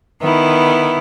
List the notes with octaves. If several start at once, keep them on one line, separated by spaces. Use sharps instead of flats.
D#3 B3 E4